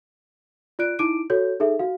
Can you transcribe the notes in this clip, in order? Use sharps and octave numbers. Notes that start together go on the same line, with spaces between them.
F4 D5 F#6 D7
D#4 E4 D6 D7 D#7
F#4 A4 C#5 G6
D#4 G#4 A4 E5
F#4 F5